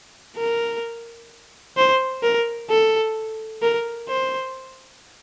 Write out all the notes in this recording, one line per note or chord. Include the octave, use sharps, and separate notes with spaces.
A#4
C5
A#4
A4
A#4
C5